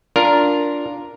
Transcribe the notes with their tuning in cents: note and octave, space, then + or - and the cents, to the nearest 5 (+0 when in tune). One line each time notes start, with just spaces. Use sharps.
D4 -10 F4 +0 A#4 +0